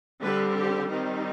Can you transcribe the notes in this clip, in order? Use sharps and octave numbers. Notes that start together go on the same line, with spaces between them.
D3 G3 C4 B4
G4
D#3 G3 C4 D#4